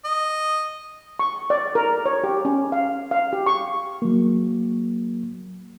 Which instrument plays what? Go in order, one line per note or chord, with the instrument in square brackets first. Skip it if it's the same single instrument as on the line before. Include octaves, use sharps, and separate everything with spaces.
[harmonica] D#5
[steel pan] C#6
D5
A#4
C#5
G4
C#4
F5
F5
G4
C#6
[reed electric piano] F#3 A#3